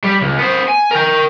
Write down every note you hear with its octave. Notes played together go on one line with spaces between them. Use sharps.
G3
C#2
B3 C5
G#5
A#4 G5